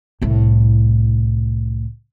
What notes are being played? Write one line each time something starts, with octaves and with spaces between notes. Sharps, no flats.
C2 A2